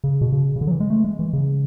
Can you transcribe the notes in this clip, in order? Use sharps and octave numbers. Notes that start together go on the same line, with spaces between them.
C#3
B2
C#3
C#3
D3
F#3
E3
G#3
A3
G#3
E3
C#3